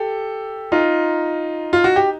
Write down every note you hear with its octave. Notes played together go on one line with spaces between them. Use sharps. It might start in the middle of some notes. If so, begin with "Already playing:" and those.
Already playing: G4 A4
D#4 F4
F4
F#4
G4